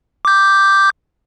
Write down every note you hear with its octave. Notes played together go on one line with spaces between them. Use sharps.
D6 G6